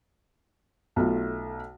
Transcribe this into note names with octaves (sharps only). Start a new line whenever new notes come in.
B1 A3 F4